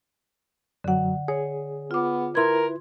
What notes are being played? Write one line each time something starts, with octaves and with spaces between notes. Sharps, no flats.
F#2 D3 F#3 F#5
G#4 C#5
B3 F4 D6
E4 A#4 B4 C6 G#6